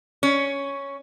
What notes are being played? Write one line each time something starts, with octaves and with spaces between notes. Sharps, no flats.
C#4